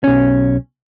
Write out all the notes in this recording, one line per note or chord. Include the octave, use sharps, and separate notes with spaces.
B1 C#4